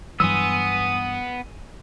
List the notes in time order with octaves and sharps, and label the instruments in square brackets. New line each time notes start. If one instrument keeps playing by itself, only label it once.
[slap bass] G2 E3 F#3 [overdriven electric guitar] B3 [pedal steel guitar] G#5 C6 E6 [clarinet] D#6